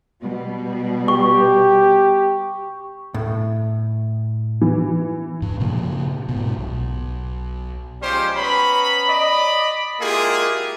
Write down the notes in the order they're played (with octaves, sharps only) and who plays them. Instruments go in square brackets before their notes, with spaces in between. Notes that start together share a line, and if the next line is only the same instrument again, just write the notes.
[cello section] B2 G3
[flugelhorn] G4 [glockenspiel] C#6
[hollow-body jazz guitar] A2
[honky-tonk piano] E3
[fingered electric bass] G2
A#2 C#3 F3 A#3
G#2 B2
B1
[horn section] F3 G3 G#3 C#4 G4 C5
B3 C#4 A#5 B5
D5 D#5 B5
G#3 A#3 E4 F4 G4 G#4